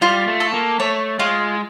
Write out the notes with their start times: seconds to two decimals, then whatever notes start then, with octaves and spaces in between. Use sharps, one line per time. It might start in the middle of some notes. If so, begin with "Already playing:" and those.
0.01 G3 F4
0.27 A3
0.40 A4
0.54 A#3
0.80 A3 C#5
1.19 G#3 F4